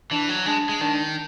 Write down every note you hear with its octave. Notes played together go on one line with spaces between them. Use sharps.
E3 D4
F#3
G#3 D4
G#3
D#3 D4